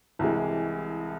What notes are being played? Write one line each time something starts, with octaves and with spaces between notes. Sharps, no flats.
C2 C3 E3 G#3